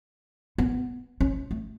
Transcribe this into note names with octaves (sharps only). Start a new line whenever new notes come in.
B3
C#4
A3